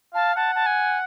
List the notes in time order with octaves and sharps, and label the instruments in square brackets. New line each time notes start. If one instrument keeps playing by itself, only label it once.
[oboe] F5 [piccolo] A5
[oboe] F#5 [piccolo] A5
[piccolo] A5
G#5